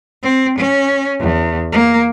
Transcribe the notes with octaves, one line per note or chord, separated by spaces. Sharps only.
C4
C#4
E2
A#3